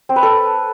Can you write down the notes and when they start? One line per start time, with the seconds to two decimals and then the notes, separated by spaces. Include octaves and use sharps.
0.09 C4
0.16 B4
0.23 A4